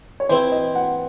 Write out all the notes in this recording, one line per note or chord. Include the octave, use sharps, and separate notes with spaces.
C#5
E3 C4 E4 C5
D#5
F#5